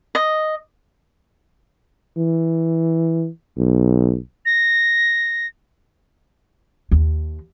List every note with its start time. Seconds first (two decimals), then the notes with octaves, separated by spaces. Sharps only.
0.15 D#5
2.18 E3
3.58 B1
4.46 A#6
6.91 D#2